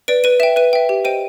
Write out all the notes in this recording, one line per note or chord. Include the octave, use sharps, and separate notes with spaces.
B4 D5 D7
B4 D#7
E5 G5 E7
B4 D#7
E5 G5
G4
C5 D#5 G5 D#7